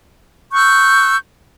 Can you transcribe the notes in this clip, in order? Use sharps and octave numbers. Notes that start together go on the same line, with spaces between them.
C#6 E6 F#6 G6